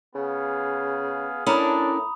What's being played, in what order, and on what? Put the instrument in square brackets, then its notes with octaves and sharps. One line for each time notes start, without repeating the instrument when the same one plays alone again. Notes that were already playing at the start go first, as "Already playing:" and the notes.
[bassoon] C#3 [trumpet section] B3 G#4 F5
[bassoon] A2 [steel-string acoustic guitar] C#4 E4 A#4 [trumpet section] D4 [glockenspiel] A#5 B5 D#6